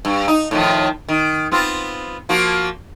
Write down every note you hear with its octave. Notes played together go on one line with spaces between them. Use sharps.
G2
D#4
A2 D#3 F3
D#3
B3 C4 F4
F3 A#3 F#4